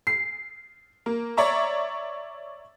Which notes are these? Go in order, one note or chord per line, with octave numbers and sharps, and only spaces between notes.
C7
A#3
C#5 D5 E5 A#5 C#6